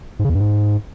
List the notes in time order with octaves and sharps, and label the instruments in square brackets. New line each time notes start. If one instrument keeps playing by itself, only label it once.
[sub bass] G#2
C#3
E2
G2
G#2